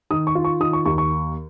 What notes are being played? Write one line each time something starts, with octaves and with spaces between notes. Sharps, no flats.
D#3 D#6
C#6
F4
C#6
D#3 D#6
C#6
D#2 C#6
C#6